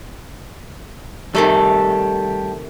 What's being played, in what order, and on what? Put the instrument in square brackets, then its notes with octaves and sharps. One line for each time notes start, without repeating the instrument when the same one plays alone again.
[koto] C3 D#3 A3 [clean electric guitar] G3 A4